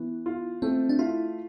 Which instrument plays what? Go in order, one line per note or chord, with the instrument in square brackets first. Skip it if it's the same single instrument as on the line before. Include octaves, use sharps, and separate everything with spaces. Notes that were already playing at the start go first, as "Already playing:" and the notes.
Already playing: [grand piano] E3 [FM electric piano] B3
[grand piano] F4
[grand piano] A3 [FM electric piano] C4
[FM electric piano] D4
[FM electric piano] E4 [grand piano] F4